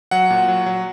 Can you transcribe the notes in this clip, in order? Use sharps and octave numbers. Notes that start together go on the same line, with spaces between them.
F#3 F#5
A#2
F#3
F#3